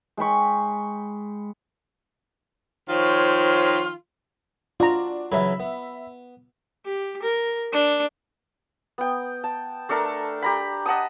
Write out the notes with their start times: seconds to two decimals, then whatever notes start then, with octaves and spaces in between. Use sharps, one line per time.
0.17 G#3 G5 B5 C#6
2.89 D#3 F3 F4 C5 C#5
4.80 D4 F4 F#4 A#5
5.32 C#3 E3 F#3 E5 B5
5.60 B3
6.85 G4
7.22 A#4
7.72 D4
8.98 B3 G5
9.44 A5
9.89 A3 D4 A4 A#4
10.42 G4 A#5 B5
10.86 D#5 F#5 A5 D#6